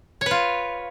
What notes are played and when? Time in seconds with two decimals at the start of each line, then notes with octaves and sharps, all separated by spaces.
0.21 C#5
0.26 B4
0.31 F4